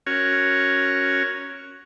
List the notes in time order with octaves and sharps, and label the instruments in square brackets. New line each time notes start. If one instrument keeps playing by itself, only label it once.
[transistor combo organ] C#4 F#4 A#4 C#5